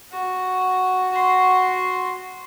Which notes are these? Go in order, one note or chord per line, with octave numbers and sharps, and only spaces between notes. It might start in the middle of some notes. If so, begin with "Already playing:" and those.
F#4
F#4 C6